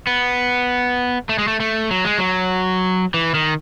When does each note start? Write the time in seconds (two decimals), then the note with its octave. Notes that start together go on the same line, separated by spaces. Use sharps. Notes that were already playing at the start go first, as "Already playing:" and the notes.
0.07 B3
1.29 A3
1.38 G#3
1.48 A3
1.60 A3
1.91 F#3
2.05 G#3
2.18 F#3
3.14 E3
3.34 D#3